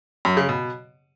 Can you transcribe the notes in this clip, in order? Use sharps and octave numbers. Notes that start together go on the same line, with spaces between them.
F#2
C#3
B2